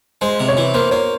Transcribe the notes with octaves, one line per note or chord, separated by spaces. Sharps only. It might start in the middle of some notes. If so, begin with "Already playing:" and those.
G#3 C5
C3
C#5
E3
A#3 C5
A#3 C#5